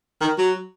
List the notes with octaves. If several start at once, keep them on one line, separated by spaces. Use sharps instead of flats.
D#3
F#3